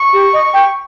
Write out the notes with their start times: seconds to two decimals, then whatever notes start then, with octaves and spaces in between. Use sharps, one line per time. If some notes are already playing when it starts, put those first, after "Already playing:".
Already playing: C#6
0.13 G4
0.33 D#5
0.53 G5